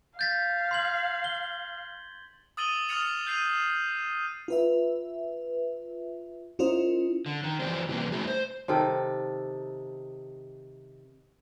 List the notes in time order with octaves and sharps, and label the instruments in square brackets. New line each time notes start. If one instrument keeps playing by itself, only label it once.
[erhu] F5 [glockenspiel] G6 A6 B6
[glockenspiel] C6 G#6 F#7
G7
[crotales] D#6 E6 A6 D#7 F#7 G7
D6 D#6 F6 A6 C#7 F7
G6 A6 C7 D#7 F7
[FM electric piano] F4 B4 E5
C#4 E4 F4 A#4 C5 D#5
[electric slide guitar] D3
D#3
E3 F3 G3 C4
C3 E3 G3 A#3 C4
A3 D#4 E4 F#4 G#4
C5
[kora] C3 D#3 A4